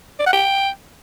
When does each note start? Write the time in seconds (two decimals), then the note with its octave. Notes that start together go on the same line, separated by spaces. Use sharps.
0.19 D5
0.26 F#5
0.33 G5